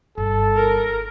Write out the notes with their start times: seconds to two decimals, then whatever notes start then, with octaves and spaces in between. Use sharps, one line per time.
0.18 G1 A4
0.56 A#4